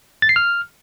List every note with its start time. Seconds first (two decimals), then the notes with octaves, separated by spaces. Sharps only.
0.22 A6
0.29 C7
0.36 F6